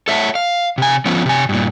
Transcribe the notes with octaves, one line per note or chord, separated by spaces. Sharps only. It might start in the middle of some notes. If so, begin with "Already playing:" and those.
A4 C#5 E5 F#5 G#5 A5
F5
C3 G#5
F3 A3 B3 C#4 F4
C3 G#5
G2 A#2